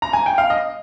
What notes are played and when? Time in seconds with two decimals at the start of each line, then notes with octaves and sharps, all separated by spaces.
0.02 A#5
0.13 G#5
0.26 G5
0.38 F5
0.50 D#5